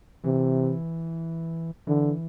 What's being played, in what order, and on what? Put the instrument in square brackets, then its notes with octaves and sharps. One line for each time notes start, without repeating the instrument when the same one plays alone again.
[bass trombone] C3 [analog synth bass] E3
[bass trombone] D3 [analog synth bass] E3